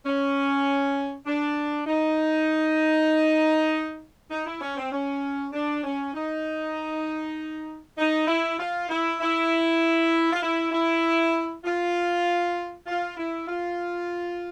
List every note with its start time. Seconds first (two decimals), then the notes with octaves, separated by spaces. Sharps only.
0.04 C#4
1.26 D4
1.86 D#4
4.31 D#4
4.46 E4
4.61 C#4
4.77 C4
4.92 C#4
5.53 D4
5.84 C#4
6.14 D#4
7.98 D#4
8.27 E4
8.59 F4
8.89 E4
9.20 E4
10.32 F4
10.42 E4
10.72 E4
11.64 F4
12.86 F4
13.17 E4
13.47 F4